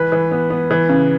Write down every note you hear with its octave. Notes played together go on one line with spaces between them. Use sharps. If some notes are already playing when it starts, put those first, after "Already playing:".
Already playing: E3 B4
E3
B3
B3
E3
C#3